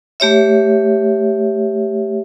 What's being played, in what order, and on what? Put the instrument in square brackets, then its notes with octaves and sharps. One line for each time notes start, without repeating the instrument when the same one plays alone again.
[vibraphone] A3 G4 C#5 E5